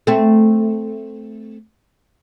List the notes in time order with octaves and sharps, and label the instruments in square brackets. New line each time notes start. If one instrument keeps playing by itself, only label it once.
[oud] A3 C4